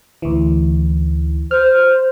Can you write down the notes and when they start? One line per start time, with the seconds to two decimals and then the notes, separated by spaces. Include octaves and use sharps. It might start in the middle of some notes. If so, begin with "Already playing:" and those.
0.22 D2 E3
1.51 C5 F6